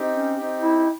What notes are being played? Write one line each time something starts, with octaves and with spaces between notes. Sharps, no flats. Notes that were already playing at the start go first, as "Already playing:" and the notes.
Already playing: C4 D#4 G4
C#4
C4 D#4 G4
E4